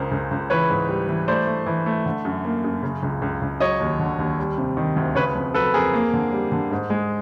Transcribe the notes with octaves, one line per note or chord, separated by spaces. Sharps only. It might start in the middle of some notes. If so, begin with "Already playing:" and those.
Already playing: C#2 C#3 A#4 C5
C#2
C#2
E3 B4 C#5
G#2
G3
E3
A3 C5 D5
A3
E3
A3
D3
F#2
A#3
F#2
C#3
C#2
C#2
C#2
F#3 C#5 D#5
D#2
D3
D#2
G3
C3
D#3
D2
C#3 B4 C#5
F2
F#3 A4 B4
F2 G#4 A#4
A#3
D3
G3
D3
G#2
G#3